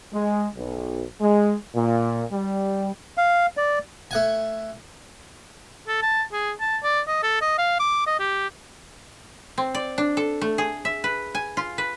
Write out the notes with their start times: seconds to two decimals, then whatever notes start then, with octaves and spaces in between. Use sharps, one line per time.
0.13 G#3
0.57 B1
1.21 G#3
1.75 A#2
2.32 G3
3.18 F5
3.57 D5
4.11 A3 F#5 G#5
5.88 A4
6.02 A5
6.32 G#4
6.60 A5
6.83 D5
7.08 D#5
7.23 A4
7.41 D#5
7.58 F5
7.80 D6
8.07 D#5
8.19 G4
9.58 C4
9.75 D5
9.98 D4
10.17 A4
10.41 A3
10.58 G#4
10.85 E5
11.04 B4
11.35 G#5
11.57 F4
11.78 B4